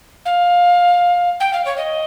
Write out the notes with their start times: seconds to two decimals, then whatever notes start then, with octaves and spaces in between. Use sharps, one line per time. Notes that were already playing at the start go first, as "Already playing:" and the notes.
0.25 F5
1.40 G5
1.53 F5
1.65 C#5
1.77 D#5